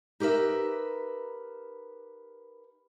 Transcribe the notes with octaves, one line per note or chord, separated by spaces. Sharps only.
D#4 G4 A#4 B4 E5